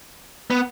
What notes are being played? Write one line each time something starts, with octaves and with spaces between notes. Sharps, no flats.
B3